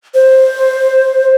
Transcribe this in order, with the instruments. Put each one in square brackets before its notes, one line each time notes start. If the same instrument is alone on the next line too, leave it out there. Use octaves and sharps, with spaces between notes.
[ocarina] C5